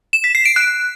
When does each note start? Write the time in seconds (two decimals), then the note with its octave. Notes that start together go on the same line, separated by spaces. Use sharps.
0.13 E7
0.24 B6
0.35 C7
0.45 D7
0.56 F#6